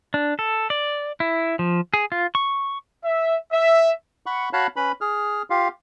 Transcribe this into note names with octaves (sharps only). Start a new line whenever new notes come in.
D4
A4
D5
E4
F3
G#4
F4
C#6
E5
E5
F#5 B5 C#6
F#4 C#5 F5 A5 B5 F#6
C#4 B4 B5
G#4 F6
F4 G4 F5